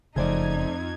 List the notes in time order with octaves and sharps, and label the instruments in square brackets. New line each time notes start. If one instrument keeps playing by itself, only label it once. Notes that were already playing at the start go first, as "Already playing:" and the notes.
[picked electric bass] F#1 C#3 [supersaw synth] F2 G#6 [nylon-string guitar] A3 C5 D5 [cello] D#4